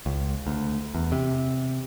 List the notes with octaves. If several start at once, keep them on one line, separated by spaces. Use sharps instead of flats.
C#2
D2
E2
C3